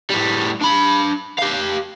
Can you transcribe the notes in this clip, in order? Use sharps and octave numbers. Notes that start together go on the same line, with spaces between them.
A2 G3
D4 B5
G4 F5